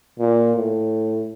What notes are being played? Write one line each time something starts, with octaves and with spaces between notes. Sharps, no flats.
A#2
A2